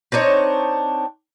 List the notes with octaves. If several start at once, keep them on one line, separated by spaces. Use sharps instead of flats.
C4 D4 D#4 C#5